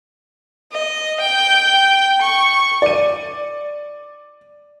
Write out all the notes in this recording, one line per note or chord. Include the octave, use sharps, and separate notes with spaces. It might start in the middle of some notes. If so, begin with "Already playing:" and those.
D#5
G5
C#6
D5 D#7